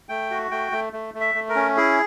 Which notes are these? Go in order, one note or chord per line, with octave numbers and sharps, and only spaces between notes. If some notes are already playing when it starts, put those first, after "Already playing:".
A3 G5
F#4
A3 G5
A3
A3
A3
E5
A3
A#4
C#4
E4 G#4